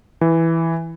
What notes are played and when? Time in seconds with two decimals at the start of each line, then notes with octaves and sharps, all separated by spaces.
0.21 E3